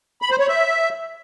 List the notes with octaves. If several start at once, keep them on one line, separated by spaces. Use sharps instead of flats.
B5
C5
C#5
E5